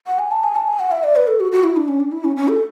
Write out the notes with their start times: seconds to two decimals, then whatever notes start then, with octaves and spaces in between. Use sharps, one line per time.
0.07 F#5
0.19 G#5
0.31 A5
0.43 G#5
0.56 A5
0.67 G#5
0.79 F#5
0.91 E5
1.04 D5
1.16 B4
1.27 A4
1.40 F#4
1.52 F#4
1.64 E4
1.76 D4
1.88 C#4
2.00 D4
2.12 E4
2.24 C#4
2.36 C#4
2.48 A4